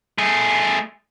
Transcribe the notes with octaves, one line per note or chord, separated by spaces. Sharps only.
A3 G#4